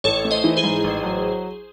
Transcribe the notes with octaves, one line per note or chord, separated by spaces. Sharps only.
A1 A4 C#5
A3
C5 D#5
E3
G#4 C5
G#2
A1
F#3